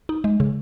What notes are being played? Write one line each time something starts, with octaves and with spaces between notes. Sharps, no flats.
D#4
G#3
C#3